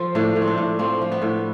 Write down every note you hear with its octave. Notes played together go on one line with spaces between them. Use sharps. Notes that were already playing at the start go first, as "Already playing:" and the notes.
Already playing: F3 F4 A4
A2 D4
A2
C4
D4
A2
F3 C4
F3
B3
A2